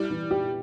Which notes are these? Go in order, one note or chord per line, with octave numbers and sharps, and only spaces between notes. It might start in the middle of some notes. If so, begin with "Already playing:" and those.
Already playing: G3 E4
E3
G4